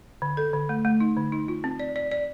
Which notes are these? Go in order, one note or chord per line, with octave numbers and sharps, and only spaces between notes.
D3
A4
D3
A3
A3
D#4
D3
D#4
F4
C4
D5
D5
D5